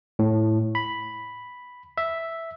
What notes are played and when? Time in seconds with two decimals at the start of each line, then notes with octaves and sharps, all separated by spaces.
0.19 A2
0.75 B5
1.98 E5